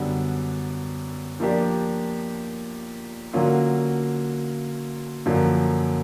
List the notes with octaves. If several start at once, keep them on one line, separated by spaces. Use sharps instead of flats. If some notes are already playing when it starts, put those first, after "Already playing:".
Already playing: F#2 D3 G3 B3 D4
F3 A#3 D4 G4
D3 F#3 A#3 C#4 F4
F#2 D3 F3 A#3